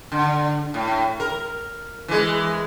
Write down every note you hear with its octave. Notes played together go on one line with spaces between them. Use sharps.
D3
A2
A#4
E3 G#3